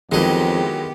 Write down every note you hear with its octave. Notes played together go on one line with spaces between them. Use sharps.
F2 D#3 E3 F#3 G#3 B3 G4 D#5